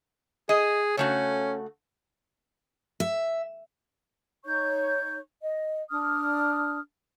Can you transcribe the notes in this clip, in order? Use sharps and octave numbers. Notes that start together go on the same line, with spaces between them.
G#4 D#5
C#3 A3 C#4 F#4
E5
D#4 C#5 C#6 G6
D#5
D4 D#6 F6